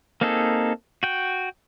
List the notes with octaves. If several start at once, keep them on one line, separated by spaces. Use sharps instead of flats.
A#3 C4 D#4 G#4 A4
F#4 G5